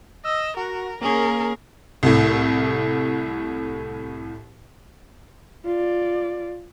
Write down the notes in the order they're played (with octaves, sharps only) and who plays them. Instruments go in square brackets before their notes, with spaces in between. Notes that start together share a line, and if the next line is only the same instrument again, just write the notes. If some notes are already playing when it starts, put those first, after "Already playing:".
[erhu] D#5 [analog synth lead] E6
[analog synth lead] F#4 [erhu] A#4
[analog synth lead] A#3 [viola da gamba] C#4 G#4 [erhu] A#4
[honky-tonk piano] C2 A2
[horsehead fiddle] F4 D5